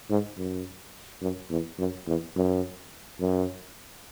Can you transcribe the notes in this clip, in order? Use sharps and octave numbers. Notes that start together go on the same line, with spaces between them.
G#2
F#2
F#2
E2
F#2
E2
F#2
F#2